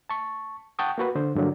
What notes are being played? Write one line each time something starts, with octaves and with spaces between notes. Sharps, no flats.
A5 C#6
F#5 G5 A5 C#6 D#6
A#3 F#4 B4
D3 C5
G2 D3 F#3 A#3